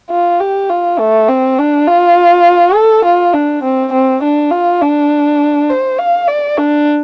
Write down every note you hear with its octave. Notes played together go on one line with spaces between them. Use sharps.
F4
G4
F4
A3
C4
D4
F4
A4
F4
D4
C4
C4
D4
F4
D4
C5
F5
D5
D4